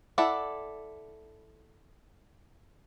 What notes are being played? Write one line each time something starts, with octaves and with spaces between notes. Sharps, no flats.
E4 A4 D5 F#5